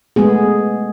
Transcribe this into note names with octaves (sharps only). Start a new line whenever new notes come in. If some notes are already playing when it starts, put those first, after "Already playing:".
G#3 A3 B3 G#4